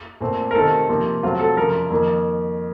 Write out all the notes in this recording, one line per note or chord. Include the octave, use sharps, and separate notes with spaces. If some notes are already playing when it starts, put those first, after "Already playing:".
A#2 A3 C4
A#4
C3 D#3 A3 C4 A4
C3 F3 A#3
C3 F#3 A3 C4 F4
A4
F2 C#3 F3 A#4
F2 D#3 A#3